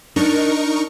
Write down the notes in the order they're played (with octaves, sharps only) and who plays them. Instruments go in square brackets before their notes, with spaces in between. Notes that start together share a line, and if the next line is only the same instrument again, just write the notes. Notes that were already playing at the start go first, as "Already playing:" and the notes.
[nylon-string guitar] D4 [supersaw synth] D#4 A#4 C#6